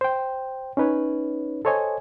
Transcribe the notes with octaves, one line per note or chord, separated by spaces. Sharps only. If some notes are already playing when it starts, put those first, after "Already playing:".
C5 G5
C#4 D#4 B4 C#5
A4 C5 C#5 D#5 G#5